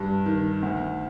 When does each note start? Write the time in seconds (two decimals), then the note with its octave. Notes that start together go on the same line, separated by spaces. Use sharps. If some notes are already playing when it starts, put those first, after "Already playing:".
Already playing: G2
0.26 D#3
0.62 D2